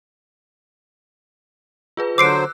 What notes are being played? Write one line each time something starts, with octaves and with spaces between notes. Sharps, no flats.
F4 G#4 B4
D3 F#3 C5 D6 E6 F#6 C7 D7